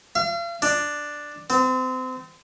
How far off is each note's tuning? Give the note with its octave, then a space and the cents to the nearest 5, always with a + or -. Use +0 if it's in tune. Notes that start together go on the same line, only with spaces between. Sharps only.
F5 -40
D4 +5
C4 -30